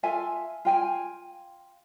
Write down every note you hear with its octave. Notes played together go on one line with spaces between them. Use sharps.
F4 A4 E5 G#5
F4 G5 G#5